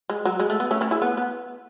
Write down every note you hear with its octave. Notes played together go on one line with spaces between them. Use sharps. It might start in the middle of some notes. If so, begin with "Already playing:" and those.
G#3
F#3
G#3
A3
B3
A3 C#4
A3 C#4
E4 G#4
B3
B3